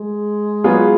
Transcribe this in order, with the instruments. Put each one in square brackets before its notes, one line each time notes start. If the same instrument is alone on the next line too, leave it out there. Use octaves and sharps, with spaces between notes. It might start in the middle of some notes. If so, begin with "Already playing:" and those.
Already playing: [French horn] G#3
[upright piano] F#3 B3 F4 G#4